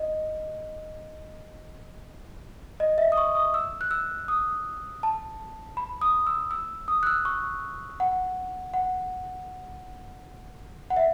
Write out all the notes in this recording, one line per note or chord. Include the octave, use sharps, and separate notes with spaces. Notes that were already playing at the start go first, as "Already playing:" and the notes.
Already playing: D#5
D#5
E5
D#6
C#6
D#6
E6
F#6
E6
D#6
A5
B5
D#6
E6
E6
D#6
F#6
E6
C#6
F#5
F#5
F#5
E5